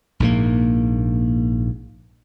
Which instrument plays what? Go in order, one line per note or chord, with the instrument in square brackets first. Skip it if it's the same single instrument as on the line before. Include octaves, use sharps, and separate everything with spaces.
[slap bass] A#1 G#2 D3 A#3